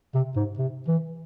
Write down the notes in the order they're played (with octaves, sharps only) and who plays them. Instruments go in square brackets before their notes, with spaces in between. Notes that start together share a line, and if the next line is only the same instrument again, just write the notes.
[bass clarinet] C3
G#2
C3
E3